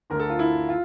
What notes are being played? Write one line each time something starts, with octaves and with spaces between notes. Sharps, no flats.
D2 D3 A#4
A4
F4
E4
F4